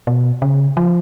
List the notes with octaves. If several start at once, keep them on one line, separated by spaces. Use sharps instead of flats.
B2
C#3
F3